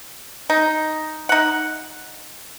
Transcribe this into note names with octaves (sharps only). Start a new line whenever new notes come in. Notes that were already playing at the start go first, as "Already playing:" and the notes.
D#4
D#4 F#5